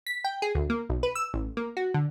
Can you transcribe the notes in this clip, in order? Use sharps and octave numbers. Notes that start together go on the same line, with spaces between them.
B6
G5
G#4
D2
A#3
B1
B4
E6
A1
A#3
F#4
D3